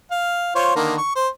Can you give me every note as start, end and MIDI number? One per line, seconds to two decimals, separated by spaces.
0.11 0.51 77
0.55 0.72 65
0.55 0.72 72
0.55 0.72 73
0.76 0.97 50
0.76 0.97 51
0.76 0.97 58
0.98 1.13 85
1.16 1.28 72